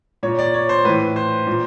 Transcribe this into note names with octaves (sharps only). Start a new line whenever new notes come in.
A#2 C#5
D5
C#5
C5
A2 E3 B4
C5
A#2